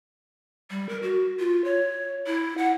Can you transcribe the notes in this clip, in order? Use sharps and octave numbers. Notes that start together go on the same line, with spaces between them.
G3
A#4
F#4
F4
C#5
E4
F#5